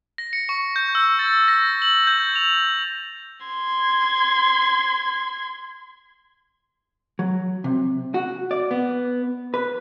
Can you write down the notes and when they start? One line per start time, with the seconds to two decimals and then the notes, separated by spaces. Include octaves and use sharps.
0.18 A#6
0.33 C#7
0.49 C#6
0.76 G6
0.95 E6
1.19 A6
1.48 A#6
1.82 F#7
2.07 G6
2.36 F7
3.46 C6 G#6
7.19 F#3
7.64 C3
8.14 F#4
8.51 D5
8.71 B3
9.54 B4